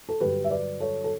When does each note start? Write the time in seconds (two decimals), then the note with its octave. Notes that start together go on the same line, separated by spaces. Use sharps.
0.09 A4
0.20 G2 D3 F#3 G4 B4
0.44 E5
0.50 B4 D5
0.80 A4 C#5
1.04 A4